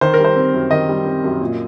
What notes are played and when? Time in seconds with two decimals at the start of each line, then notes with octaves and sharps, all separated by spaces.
0.01 D#3 C5
0.14 A#4
0.19 G3
0.25 C5
0.36 C4
0.54 F#2
0.71 D#3 D#5
0.89 G3
1.06 C4
1.24 F#2
1.41 A#2